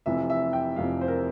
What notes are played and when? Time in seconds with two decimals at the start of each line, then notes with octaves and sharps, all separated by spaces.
0.06 F1 F2 C3 E3 E5
0.30 E5
0.53 G5
0.76 F1 F2 C3 E3 F5
1.01 C5
1.08 A#4